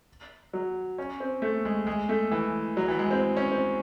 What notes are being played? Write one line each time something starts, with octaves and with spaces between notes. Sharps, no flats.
F#3
C#4
C4
A3
G#3
G#3
A3
E3
F#3
E3
G#3
C4
C#4
C4